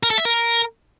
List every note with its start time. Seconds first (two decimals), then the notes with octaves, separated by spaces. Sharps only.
0.03 A#4
0.11 A4
0.18 E5
0.25 A#4